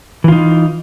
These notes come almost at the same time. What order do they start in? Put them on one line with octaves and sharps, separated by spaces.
E3 F4 D#4